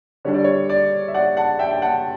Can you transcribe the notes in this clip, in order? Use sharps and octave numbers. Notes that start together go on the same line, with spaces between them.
D3 G3 D4 C#5
D5
C#5
D5
E5
D5 F#5
F#5 A5
E5 G5
G5
F#5 A5